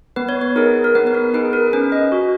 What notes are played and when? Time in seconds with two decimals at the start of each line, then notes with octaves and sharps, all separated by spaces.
0.16 B3 B4
0.29 C#5
0.42 B4
0.56 D#4 G#4 A#4
0.84 A#4
0.95 B3 B4
1.07 B4
1.14 A#4
1.34 D#4 G#4 B4
1.53 A#4
1.73 C#4 B4
1.92 D#5
2.12 F#4